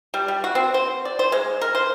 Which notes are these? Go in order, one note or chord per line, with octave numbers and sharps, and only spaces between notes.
G3
G3
F#4
C4
C5
D5
C5
G#3
A#4
C5